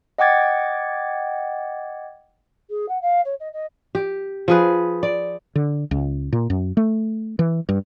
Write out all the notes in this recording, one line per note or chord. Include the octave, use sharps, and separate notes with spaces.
D#5 F#5 G5 D6 G#6 A6
G#4
F#5
F5
C#5
D#5
D#5
G4
F3 G#4 B4
D5
D3
C#2
A#2
F#2
A3
E3
G2